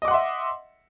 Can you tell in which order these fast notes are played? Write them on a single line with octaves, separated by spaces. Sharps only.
D#5 D6 F#5 C6 E5